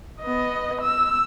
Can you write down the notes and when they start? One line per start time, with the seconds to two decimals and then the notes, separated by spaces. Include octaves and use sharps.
0.21 B3 D#5
0.81 E6